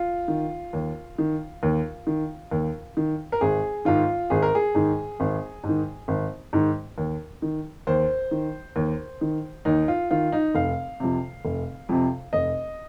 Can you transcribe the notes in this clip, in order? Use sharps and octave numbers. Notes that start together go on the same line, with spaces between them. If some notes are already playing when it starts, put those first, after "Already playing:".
Already playing: F4
D#3
D#2
D#3
D#2
D#3
D#2
D#3
A#4
G#1 G#4
G#2 D#3 F4
G#1 G#4
A#4
G#4
G#2 D#3
G#1
G#2
D#3
G#1
G#2 D#3
D#2
D#3
D#2 C5
D#3
D#2
D#3
D#2 D#4
F4
D#3 F4
D#4
F1 F5
F2 C3
F1
F2 C3
F1 D#5